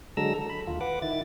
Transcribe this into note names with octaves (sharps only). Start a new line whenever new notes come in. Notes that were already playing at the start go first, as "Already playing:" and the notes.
D3 F#3 G#3 A4 A#5 E6
A4
B5
D#2 F4
B4 F#5 D6
D#3 E4 A6